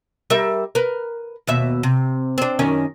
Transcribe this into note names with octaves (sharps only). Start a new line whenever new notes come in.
G3 A#4 E5
A#4 B4
D#2 B2 E5
C3
C4 D4
F#2 D#3 C#4